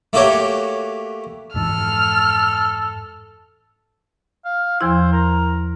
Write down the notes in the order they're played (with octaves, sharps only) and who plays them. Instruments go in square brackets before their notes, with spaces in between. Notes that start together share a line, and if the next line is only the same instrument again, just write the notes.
[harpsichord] A3 A#3 F#4 G4 C#5
[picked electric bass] F2 G#2 E3 [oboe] A4 [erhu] F6
[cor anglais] F5
[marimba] E2 F3 E4 [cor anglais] C5
[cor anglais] A#4